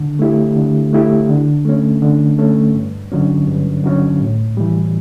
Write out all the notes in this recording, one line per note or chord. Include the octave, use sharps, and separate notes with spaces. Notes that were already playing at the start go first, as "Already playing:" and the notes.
Already playing: D3
A3 E4 G4
D3
A3 E4 G4
D3
A3 C#4
D3
A3 C#4
G2
D3 F#3 C#4
G2
D3 F#3 C#4
A2
E3 G3